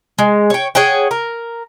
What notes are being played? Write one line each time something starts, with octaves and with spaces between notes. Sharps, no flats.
G#3
C#5 G5
G#4 C#5 F#5 G5
A#4